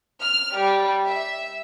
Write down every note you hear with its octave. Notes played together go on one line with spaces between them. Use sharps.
F6
G3
E5